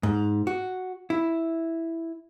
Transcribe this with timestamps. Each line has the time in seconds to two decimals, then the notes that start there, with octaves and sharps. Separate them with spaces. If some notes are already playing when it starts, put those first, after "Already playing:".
0.03 G#2
0.47 F#4
1.10 E4